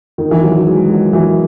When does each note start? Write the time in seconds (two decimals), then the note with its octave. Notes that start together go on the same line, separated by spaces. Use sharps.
0.18 D#3
0.31 E3
0.43 F#3
0.66 G#3
0.89 F#3
1.13 E3